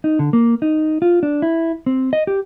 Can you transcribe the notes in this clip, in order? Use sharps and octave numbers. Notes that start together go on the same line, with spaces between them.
D#4
D3
A#3
D#4
F4
D4
E4
C4
D#5
G4